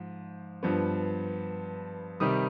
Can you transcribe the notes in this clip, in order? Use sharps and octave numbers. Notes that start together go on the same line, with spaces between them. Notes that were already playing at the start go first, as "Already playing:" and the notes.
Already playing: G#2 F3
G2 F3 B3
C3 D#3 G3 D#6